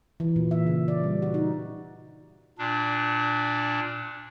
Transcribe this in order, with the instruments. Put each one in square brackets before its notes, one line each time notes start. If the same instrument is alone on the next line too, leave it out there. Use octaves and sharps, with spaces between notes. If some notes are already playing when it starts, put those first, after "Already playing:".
[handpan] E3
A#2
E5
C#3
D5
G3
F#4
D#4
[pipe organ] A#2 D4